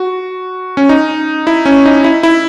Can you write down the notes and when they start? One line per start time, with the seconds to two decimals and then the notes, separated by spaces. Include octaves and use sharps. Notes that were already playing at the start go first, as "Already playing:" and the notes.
Already playing: F#4
0.77 C#4
0.89 D#4
1.47 E4
1.65 C#4
1.86 D#4
2.04 E4
2.23 E4